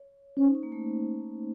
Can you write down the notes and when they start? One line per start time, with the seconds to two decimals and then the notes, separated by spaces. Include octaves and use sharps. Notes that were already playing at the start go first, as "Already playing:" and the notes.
Already playing: C#5
0.37 C#4 C5
0.46 D#4
0.55 C#4
0.63 A#3
0.72 A3